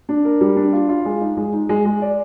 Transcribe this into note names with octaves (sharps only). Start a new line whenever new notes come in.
D4
A#4
G3
D4
F4
F4
G#3
D#4
G#3
D#4
G#3
G#3
D5